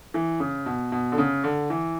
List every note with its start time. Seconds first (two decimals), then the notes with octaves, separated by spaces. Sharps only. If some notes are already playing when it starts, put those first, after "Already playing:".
0.14 E3
0.40 C#3
0.66 B2
0.92 B2
1.12 D3
1.18 C#3
1.44 D3
1.70 E3